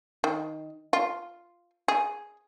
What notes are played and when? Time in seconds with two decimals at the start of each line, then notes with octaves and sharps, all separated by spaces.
0.24 D#3
0.93 F4
1.88 G#4